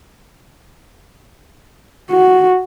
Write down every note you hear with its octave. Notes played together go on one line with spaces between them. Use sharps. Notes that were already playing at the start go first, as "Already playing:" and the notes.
F#4